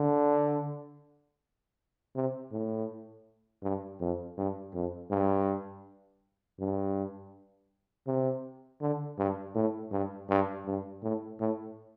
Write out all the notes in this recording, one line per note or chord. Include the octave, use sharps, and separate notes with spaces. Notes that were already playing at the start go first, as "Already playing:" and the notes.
Already playing: D3
C3
A2
G2
F2
G2
F2
G2
G2
C3
D3
G2
A2
G2
G2
G2
A2
A2